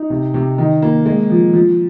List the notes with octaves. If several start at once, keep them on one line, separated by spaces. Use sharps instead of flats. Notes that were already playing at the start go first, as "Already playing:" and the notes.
Already playing: D#4
C3
C3
D#3
A#3
G#3
F3
F3